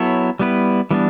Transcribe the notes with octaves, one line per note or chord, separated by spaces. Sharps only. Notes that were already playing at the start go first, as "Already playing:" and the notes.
Already playing: F#3 B3 E4 A4 C#5
G3 B3 E4 B4
E3 G3 B3 D4